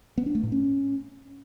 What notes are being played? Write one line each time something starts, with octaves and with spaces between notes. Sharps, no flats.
B3
D4
A3
A2
C#4